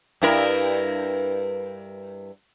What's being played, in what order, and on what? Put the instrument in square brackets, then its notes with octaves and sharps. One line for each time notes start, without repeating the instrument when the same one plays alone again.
[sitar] G2 E4 A#4